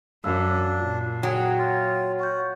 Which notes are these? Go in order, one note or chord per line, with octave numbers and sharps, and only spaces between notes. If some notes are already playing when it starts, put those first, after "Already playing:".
F#2 D4 F5 E6
A#2 F4
F#3 G#4 G5 D7
F4
F#4 F#5 G6